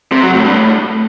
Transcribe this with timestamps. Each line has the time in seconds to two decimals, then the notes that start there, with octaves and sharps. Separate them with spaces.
0.12 C3
0.23 F#3
0.34 A2
0.45 G2
0.55 A2